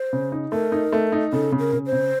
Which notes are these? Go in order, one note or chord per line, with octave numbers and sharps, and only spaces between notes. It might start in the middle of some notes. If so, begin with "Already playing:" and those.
Already playing: C5
C#3
D#4
A3 A#4
D#4
A3
D#4
C#3 A4
C#3
A#4
C#3
C5
C#3